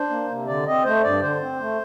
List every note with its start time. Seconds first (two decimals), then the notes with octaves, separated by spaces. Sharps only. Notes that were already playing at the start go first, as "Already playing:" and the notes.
Already playing: D4 C5
0.10 A#3
0.29 C3
0.47 D3 D5
0.66 C4 D#5
0.84 A3 C5
1.04 G2 D5
1.22 D3 C5
1.41 C4
1.60 A3